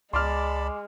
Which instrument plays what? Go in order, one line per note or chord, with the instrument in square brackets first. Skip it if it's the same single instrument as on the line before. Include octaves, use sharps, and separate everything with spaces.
[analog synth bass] C#2 [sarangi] G#3 [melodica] D5 A5 B5 [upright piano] C6 D6 F6